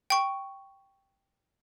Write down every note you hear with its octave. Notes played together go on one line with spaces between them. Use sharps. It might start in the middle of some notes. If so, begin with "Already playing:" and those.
G5 C#6